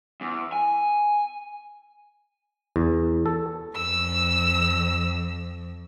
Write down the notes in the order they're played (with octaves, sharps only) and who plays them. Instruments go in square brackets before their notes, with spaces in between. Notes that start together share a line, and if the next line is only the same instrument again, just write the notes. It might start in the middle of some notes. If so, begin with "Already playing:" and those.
[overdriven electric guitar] E2
G#5
[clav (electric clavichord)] E2
A4
[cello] F2 [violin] E6